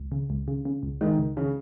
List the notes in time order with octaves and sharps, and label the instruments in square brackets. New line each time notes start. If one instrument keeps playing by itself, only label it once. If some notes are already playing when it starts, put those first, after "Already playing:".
Already playing: [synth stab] C#2
C#3
C#2
C#3
C#3
C#2
[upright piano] D#3 [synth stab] G#3
[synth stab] C#2
[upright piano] C#3